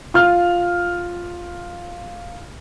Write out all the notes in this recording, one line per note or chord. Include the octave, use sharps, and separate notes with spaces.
F4 F6